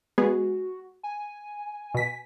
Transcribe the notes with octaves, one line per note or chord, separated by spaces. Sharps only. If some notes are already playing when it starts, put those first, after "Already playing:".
G#3 B3 F#4 G#4
G#5
B2 B6